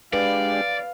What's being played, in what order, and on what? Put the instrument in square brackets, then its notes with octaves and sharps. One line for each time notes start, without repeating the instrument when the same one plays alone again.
[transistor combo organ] G#3 D4 G4 [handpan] B4 [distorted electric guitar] D5 [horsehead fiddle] F5